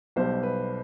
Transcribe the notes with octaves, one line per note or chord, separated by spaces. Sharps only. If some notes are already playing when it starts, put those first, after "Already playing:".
B1 B2 G3 C5
B4